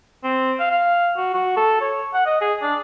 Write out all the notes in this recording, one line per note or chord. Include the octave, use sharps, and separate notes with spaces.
C4
F5
F5
F#4
F#4
A4
C#5
F#5
D#5
G#4
D4